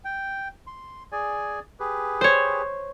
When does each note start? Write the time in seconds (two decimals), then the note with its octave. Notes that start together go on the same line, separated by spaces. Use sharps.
0.05 G5
0.67 C6
1.12 G#4 D5 G#5
1.80 G4 G#4 B4
2.21 C5 C#5